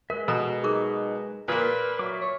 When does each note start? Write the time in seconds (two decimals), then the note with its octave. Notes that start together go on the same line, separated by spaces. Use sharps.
0.10 G#3 A#4 B4 E5
0.28 B2 A4 A#5
0.64 D#4 G#4 A#4 D6
1.48 A#2 A#3 B4
1.99 F#3 E5 C#6 D6
2.21 C#5